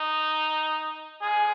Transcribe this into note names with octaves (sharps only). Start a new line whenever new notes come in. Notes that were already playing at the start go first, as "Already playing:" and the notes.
Already playing: D#4
F2 F3 G#3 G#4